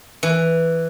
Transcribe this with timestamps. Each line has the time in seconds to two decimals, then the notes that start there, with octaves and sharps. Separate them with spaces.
0.23 E3